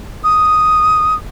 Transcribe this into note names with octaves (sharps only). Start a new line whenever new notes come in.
D#6